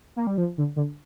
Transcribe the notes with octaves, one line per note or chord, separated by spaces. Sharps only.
A#3
G3
F3
D3
D3